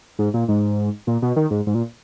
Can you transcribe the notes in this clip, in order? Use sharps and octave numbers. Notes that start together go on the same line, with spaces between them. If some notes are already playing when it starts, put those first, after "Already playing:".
G#2
A#2
G#2
A#2
B2
D#3
G#2
G#2
A#2